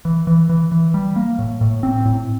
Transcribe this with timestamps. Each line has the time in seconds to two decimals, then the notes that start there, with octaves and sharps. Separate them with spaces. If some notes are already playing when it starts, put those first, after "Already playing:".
0.05 E3
0.27 E3
0.49 E3
0.72 E3
0.94 G3
1.16 A#3
1.39 A2
1.61 A2
1.83 C4
2.05 A2